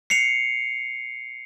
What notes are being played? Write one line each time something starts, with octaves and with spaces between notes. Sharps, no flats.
C7 C#7 F7